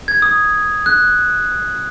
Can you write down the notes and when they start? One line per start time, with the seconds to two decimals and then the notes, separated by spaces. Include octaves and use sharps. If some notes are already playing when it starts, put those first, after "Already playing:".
0.08 G#6
0.22 D#6
0.86 F#6